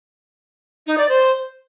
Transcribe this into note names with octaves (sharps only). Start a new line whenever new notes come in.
D#4
D5
C5